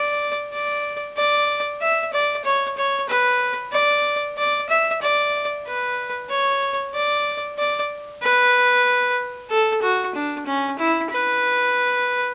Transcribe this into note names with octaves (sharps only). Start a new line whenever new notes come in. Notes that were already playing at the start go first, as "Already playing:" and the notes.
Already playing: D5
D5
D5
E5
D5
C#5
C#5
B4
D5
D5
E5
D5
B4
C#5
D5
D5
B4
A4
F#4
D4
C#4
E4
B4